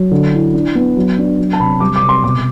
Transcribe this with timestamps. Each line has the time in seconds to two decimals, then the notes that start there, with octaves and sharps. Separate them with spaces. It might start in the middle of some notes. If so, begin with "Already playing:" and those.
Already playing: F#3
0.11 D3
0.33 E4
0.54 D4
0.75 B3
0.96 F#3
1.18 D4
1.39 F#3
1.53 A5
1.60 C3 B5
1.80 G3 D6
1.96 D6
2.02 C3
2.09 C6
2.24 B2 D6